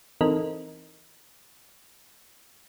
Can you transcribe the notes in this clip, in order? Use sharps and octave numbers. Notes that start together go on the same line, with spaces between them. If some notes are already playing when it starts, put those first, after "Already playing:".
E3 C4 D#4 A4 A#4 D#5